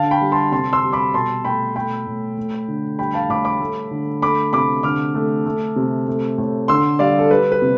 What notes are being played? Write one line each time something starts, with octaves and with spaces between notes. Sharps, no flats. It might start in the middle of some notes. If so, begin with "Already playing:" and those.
Already playing: D3 F5 A5
G5 B5
G3
A5 C6
C3 A5 C6
C6 E6
G3
B5 D6
B2 A5 C6
A3 G5 B5
A3 G5 B5
A2
A3
D3
G3 G5 B5
F5 A5
A2 B5 D6
B5 D6
A3
D3
A3 B5 D6
C3 B5 D6
D3 D6 F6
A3
A3
C3
A3
A2
D3 C6 E6
G3 D5 F5
A4
G3 B4
B4
C3